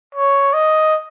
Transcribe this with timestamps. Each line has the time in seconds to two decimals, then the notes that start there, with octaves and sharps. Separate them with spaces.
0.15 C#5
0.54 D#5